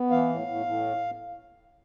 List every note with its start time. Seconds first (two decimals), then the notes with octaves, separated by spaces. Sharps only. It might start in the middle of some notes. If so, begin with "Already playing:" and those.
Already playing: B3
0.10 E3 F5
0.29 A2
0.47 A2
0.66 A2